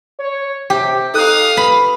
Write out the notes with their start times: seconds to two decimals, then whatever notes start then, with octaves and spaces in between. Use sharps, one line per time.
0.20 C#5
0.70 C3 G4 G5
1.14 D#4 A4 F5 D#6 F#6
1.57 B4 B5